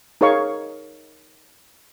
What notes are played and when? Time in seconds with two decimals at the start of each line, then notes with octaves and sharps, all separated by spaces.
0.21 D#4 G#4 A#4 C#5 F5 C#6